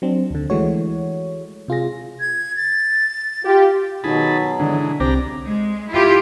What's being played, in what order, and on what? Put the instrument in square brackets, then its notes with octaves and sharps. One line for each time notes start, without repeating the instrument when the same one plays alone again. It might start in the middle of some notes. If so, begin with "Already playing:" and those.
[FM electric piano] F#3 C4 D4
D2 D3
E3 G#3 A3 F#4 C#5
C3 F4 G#4 A#6
[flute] G#6
A6
[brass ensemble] F4 G4
[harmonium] B2 F#3 [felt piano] D#3 [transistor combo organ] G#4 A5 B5
[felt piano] D3 [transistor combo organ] E3 G#3
[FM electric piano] C2 C4 [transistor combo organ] D4 G4 A#5
[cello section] G#3
E4 F4 G4